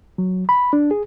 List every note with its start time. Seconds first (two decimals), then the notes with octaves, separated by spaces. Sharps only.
0.18 F#3
0.49 B5
0.73 D4
0.91 G#4